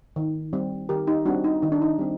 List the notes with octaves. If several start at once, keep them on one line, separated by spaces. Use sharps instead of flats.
D#3
G3 C4
D#3 G4 A#4
D#4 G4
G3 C4 D4 F#4
D#4
D#3 D#4
D4
D#4
G3 C4